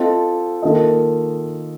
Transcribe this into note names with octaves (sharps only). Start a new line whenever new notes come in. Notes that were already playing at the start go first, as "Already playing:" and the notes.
Already playing: C4 F4 A4 D#5
D#3 A#3 F4 A4 D#5